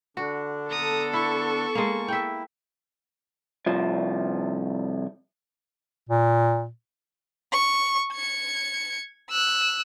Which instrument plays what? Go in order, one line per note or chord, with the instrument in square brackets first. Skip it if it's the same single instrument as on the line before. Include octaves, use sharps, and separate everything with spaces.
[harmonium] D3 D4 [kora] F#4
[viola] B3 A4 [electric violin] A#5 D#6
[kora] E4 [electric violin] C#6
[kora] G#3 A#3
[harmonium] E4 [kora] E5 G5
[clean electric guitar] C2 F3
[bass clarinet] A#2
[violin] C#6
G#6 C#7
E6 F#6